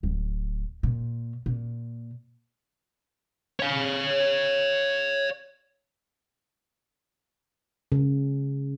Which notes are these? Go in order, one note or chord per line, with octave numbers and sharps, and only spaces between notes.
D1
A#2
A#2
C#5 F5
C#3